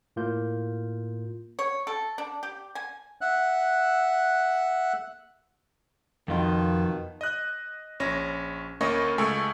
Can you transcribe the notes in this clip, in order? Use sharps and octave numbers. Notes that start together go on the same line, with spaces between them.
A2 A#3 F4 G6
C#5
A4
D4
G4
G#5
E5 F#5 F#6
F2 B2 D#3 F4
D#5 F#6
A#1 C#4 A#6
D2 A#3 C#4 D#5 C#6
C#2 A3 G#5 C#6